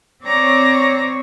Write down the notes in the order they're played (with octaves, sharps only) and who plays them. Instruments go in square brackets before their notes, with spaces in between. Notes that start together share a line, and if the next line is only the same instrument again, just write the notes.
[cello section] C4 C#5 [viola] D5 A#5